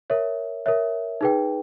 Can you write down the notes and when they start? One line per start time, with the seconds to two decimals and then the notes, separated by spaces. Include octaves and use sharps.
0.10 A#4 C#5 E5
0.66 A#4 C#5 E5
1.21 D#4 G#4 B4 G5